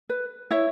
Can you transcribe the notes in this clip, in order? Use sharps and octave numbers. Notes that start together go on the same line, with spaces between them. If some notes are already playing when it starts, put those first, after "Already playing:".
B4
E4 C#5 E5